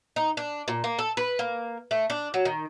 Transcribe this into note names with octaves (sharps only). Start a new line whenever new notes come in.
D#4
D4
A#2
A#3
A4
B4
A#3
A3
D4
F#3
D#3